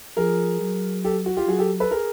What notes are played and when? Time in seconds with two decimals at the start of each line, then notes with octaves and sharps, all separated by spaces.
0.17 F3 G#4 A#4
0.61 F#3
1.04 G4 A4
1.26 F#4
1.37 F4 G4
1.48 F#3 F#4 G#4
1.58 G4 A4
1.80 A4 B4
1.91 G#4 A#4